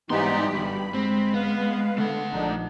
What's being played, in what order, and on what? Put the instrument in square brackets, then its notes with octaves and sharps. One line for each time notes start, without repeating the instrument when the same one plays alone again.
[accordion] G#2 E3 D#4 [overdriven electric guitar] G3 C6 [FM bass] B3 [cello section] G4
[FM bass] G1 [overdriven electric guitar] G2 [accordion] B5
[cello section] G#3 [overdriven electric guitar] C4
[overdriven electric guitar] B3 [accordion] B4 F5
[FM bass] D3 [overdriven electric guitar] A3 F#5
[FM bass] A#1 [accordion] D3 D4 D#4